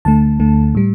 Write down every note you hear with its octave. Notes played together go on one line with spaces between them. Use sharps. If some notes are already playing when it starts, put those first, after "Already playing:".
D2 D3 A3 A5
D2 D3 A3
A2 G3